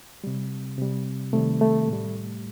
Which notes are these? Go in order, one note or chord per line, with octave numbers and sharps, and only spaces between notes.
C3 G3
C3 G3
C3 D#3 G3 A3
A3
A2
G3